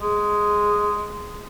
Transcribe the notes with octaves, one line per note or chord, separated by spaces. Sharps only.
G#3 G#4